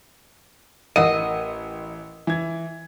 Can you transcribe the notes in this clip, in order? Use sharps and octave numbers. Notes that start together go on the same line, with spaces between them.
A1 C#4 A#4 D#5 F#5 D#7
E3 G#6